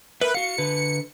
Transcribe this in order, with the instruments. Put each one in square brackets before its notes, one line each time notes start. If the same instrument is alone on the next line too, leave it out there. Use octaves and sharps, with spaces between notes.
[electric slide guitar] A#4 E5 [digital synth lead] B4
[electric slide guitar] F#4 F5 [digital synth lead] C#7
[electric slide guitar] D3 B4